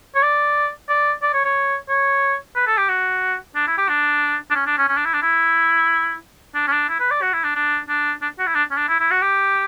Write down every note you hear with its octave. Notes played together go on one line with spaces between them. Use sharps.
C#5
D5
D5
D5
C#5
C#5
C#5
B4
A4
G4
F#4
D4
E4
G4
D4
D4
C#4
D4
C#4
C#4
D4
E4
D4
E4
D4
C#4
D4
E4
B4
D5
F#4
E4
D4
D4
D4
D4
F#4
E4
D4
C#4
D4
E4
E4
F#4
G4